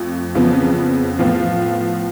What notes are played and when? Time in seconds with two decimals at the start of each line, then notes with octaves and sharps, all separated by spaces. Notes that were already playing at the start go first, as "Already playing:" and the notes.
Already playing: F2 F3 A3
0.35 F2 C#3 F3 B3
1.19 A2 F3 B3 F4